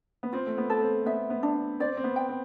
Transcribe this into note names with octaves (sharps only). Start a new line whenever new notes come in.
B3
C4 F4
A3
B3
A4
C4
B3 E5
B3
D4
C4 D5
C4
B3
G5
C4